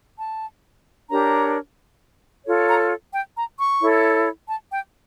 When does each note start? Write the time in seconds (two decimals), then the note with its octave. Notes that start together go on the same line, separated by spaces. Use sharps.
0.19 A5
1.10 D4 G4 A#4 C#5 A#5
2.45 F4 A4 C#5
2.68 A#5
3.13 G5
3.37 A#5
3.59 C#6
3.81 E4 A4 C#5
4.49 A5
4.72 G5